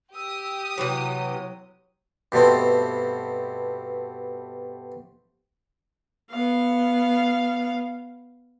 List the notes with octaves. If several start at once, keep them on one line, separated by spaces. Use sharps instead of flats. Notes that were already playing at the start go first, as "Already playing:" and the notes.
G4 D#6 E6
C3 E3 F#3 C#5
G2 B2 A3 C4
B3 F5